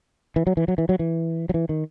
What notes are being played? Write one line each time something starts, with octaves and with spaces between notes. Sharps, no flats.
E3
F#3
E3
F#3
E3
F#3
E3
F#3
E3
D#3